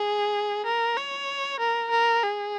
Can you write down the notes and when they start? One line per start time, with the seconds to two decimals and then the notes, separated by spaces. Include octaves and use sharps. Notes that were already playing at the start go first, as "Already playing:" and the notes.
Already playing: G#4
0.66 A#4
0.97 C#5
1.60 A#4
1.91 A#4
2.23 G#4